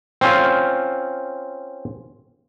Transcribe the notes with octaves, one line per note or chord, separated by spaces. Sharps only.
C4 C#4 F4